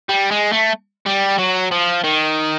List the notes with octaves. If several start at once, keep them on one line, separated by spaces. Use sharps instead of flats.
G3
G#3
A3
G3
F#3
F3
D#3